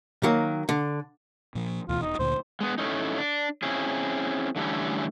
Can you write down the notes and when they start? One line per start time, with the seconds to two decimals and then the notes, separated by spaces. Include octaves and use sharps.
0.23 D#3 F#3 A#3
0.69 D3
1.55 A#2 F3
1.89 D2 B2 E3 F4
2.02 E1 D#4
2.19 D2 A#2 D3 C5
2.61 G#3 B3
2.78 A2 A3 C#4 D#4
3.19 D4
3.63 C4 C#4 E4 G#4
4.56 D3 E3 G3 A3 C#4